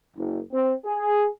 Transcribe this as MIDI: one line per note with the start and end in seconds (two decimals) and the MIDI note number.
0.17 0.38 30
0.53 0.73 60
0.85 1.28 68